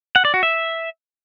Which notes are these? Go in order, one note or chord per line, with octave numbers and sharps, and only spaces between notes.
F#5
D5
F#4
E5